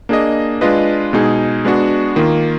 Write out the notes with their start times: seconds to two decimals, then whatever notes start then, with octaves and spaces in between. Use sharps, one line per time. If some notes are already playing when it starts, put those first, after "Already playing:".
0.09 A#3 D4 G#4 D#5
0.61 G#3 D4 F4 B4 D#5
1.13 B2 G#3 D#4 G#4
1.65 G#3 B3 D4 F#4
2.16 D#3 A#3 F4